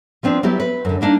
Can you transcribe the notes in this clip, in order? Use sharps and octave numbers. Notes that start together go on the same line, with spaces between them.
F3 B3 C4 D4
F#3 B3 E4 G4
B4
F#2 D3
G3 A#3 D4 D#4